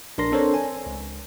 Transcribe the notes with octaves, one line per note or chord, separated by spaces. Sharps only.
A#1 D4 A#4 C6 A#6
C4 D4 A4 A#4 C5 C#5
G#5
C#2